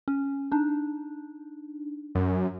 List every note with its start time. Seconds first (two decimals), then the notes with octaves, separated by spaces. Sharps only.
0.08 C#4
0.52 D4 D#4
2.15 F#2